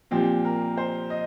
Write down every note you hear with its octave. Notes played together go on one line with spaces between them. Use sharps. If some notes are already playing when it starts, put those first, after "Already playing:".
A#2 F3 C4 G4
A#4
C5
D#5